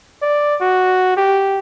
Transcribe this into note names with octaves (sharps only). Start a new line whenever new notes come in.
D5
F#4
G4